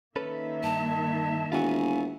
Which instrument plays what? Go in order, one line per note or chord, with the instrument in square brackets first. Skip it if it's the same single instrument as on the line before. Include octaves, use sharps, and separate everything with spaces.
[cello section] D#3 A#3 E5 [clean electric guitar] C#4 A4 B4
[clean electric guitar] G2 [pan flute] A5
[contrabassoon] E1 [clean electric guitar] F4 F#4 [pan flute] G#5